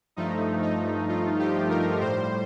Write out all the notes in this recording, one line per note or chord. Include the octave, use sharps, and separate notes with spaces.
G2 F3 A3 D#4
D#4
F4
G4
A#4
A2 G3 C5